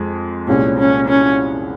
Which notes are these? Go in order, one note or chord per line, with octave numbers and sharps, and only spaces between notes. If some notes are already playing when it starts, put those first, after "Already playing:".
Already playing: F2 G#3
C2 A#2 G#3 C#4
C#4
C#4